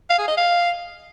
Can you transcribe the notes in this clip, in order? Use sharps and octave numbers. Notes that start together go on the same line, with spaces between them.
F5
G#4
D#5
F5